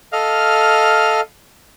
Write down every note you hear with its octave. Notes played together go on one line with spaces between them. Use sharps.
A4 D#5 F5 F6